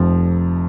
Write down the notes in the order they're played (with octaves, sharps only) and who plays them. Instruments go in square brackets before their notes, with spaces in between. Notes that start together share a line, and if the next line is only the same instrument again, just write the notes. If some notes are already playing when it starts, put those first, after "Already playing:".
Already playing: [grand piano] F1 F2 F3